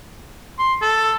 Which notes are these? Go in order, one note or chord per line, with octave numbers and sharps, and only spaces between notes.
C6
A4